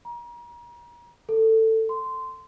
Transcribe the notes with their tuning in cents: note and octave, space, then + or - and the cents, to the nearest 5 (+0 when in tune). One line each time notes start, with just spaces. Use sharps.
A#5 +35
A4 +20
C6 -15